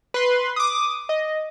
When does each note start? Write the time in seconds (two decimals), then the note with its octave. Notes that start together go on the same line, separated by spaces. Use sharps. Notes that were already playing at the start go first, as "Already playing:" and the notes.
0.14 B4 C6
0.56 D6 D#6
1.09 D#5